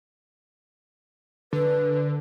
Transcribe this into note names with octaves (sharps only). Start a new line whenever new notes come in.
D3 B4